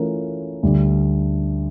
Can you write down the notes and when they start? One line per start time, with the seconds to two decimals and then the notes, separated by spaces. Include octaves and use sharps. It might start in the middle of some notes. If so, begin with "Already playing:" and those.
Already playing: E3 A3 C#4 F4 A#4
0.63 D2 D3 G3 D4